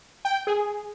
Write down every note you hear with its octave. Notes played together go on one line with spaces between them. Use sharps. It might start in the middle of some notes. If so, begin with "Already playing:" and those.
G5
G#4